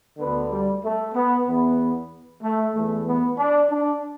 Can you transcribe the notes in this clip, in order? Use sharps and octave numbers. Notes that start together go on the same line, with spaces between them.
D2 D3 B3
G3
A3
B3
E2 E3 B3
A3
E2 E3 A3
B3
D4
D4